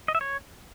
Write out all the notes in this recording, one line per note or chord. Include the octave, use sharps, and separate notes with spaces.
D#5
E5
C#5